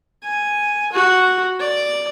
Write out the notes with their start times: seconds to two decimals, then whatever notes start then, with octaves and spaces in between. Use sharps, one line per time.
0.24 G#5
0.92 F#4
1.59 D5